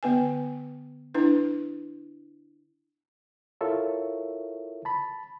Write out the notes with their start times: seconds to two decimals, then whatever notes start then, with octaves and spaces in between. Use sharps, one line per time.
0.03 D3 B3 B4 G#5
1.15 D4 E4 B4
3.61 E4 F4 A4 A#4 C#5 E5
4.85 A5 B5